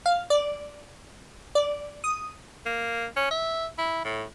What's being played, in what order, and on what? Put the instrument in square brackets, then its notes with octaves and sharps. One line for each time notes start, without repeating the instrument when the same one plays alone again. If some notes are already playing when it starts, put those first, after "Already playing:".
[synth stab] F5
D5
D5
D#6
[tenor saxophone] A#3
C#4
E5
E4
A2